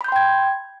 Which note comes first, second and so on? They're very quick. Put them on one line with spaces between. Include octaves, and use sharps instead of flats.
B5 G6 C6 G5 G#6